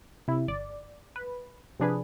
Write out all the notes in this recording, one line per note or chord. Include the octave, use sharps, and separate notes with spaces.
C3 E4
G1 D5
B4
C3 F3 D4 G#4 B4